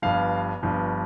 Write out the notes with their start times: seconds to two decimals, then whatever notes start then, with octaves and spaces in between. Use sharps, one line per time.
0.02 G1 G2 F3 F5
0.63 G1 G2 F3